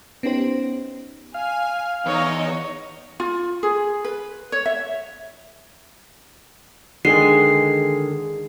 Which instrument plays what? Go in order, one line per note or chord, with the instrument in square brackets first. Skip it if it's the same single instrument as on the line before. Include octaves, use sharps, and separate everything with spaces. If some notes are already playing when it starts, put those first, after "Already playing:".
[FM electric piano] B3 C#4 D#4 G4 C5
[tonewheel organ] F5 [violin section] G#5
[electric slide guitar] E2 [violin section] D#4 D#5 [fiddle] C#5
[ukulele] F4
G#4
B4
C#5
E5
[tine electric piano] D3 D#3 G#4 [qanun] G#3 [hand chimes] C7